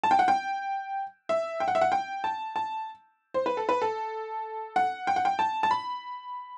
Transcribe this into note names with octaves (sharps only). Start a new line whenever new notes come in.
A5
G5
F#5
G5
E5
G5
F#5
E5
F#5
G5
A5
A5
C5
B4
A4
B4
A4
F#5
G5
F#5
G5
A5
A5
B5